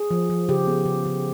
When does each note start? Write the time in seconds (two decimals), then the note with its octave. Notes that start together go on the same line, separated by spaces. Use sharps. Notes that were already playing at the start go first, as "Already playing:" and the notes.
Already playing: G#4
0.11 F3
0.30 F3
0.49 C#3 G4
0.67 B3
0.86 C#3
1.05 C#3